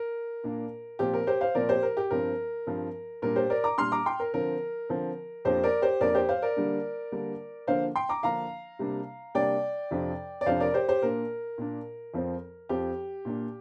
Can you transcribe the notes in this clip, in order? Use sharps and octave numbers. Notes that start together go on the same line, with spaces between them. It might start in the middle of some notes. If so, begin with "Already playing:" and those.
Already playing: A#4
A#2 A#3 D4
A#2 F3 C4 G4
A#4
G4 C5
C5 F5
A#2 F3 C4 A#4 D5
G4 C5
A#4
G4
G2 F3 C4 A#4
G2 F3 C4
A#2 G3 D4 A#4
G4 C5
A#4 D5
A#5 D6
A#2 G3 D4 C6 F6
A#5 D6
G5 C6
A#4
D3 F3 C4 A#4
D3 F3 C4
F2 F3 A#3 D4 G4 C5
A#4 D5
G4 C5
F2 F3 A#3 D4 A#4 D5
G4 C5
C5 F5
A#4 D5
D3 G3 A#3 D4
D3 G3 A#3 D4
D3 F3 A#3 D4 C5 F5
G5 C6
A#5 D6
D3 F3 A#3 D4 F5 A#5
C3 G3 A#3 D4
C3 G3 A#3 D4 D5 G5
F2 C3 F3 D4
D5
F2 C3 F3 D4 C5 F5
A#4 D5
G4 C5
G4 C5
A#2 A#3 D4 A#4
A#2 A#3 D4
F2 F3 C4
F2 F3 C4 G4
A#2 A#3 D4